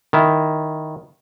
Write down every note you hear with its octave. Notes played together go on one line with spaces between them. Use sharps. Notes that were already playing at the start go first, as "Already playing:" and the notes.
D#3 E4